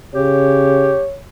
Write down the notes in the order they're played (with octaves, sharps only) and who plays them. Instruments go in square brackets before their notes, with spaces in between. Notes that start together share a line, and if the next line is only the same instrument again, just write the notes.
[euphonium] C#3 [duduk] G4 [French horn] C#5